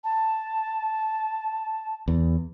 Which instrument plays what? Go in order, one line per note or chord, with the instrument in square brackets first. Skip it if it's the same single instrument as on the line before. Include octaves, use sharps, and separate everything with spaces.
[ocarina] A5
[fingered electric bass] E2